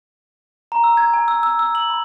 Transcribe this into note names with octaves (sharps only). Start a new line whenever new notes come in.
A#5
E6
G#6
G#5
E6
E6
E6
F#7
B5